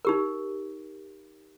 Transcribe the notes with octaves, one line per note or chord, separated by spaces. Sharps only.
D#4 G4 A#4